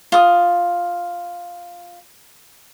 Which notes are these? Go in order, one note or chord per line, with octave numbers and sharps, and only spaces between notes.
F4 D#6